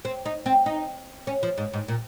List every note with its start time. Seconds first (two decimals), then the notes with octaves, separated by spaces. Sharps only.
0.05 C4
0.26 D#4
0.46 C4
0.66 D#4
1.27 C#4
1.43 F3
1.58 G#2
1.74 G#2
1.88 A#2